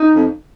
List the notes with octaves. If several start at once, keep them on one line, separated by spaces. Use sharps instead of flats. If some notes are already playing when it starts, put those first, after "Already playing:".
Already playing: D#4
F2